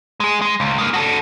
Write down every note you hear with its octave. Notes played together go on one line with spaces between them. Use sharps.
G#3 G#4
G#3
C#2
G#3 A#3
F#4 A4